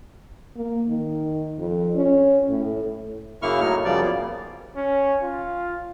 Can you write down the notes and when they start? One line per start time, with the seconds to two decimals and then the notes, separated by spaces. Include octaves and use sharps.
0.56 A#3
0.88 D#3
1.59 F2
1.95 C#4
2.49 A2
3.42 F#2 C#3 A#3 E4 C#6 F6
3.61 A2 F#3 D#4 F6
3.85 F#2 C#3 F3 G3 D5
4.01 A#3 B3
4.76 C#4
5.22 F4